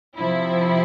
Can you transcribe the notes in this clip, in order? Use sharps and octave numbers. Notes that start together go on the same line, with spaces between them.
C3 F3 E4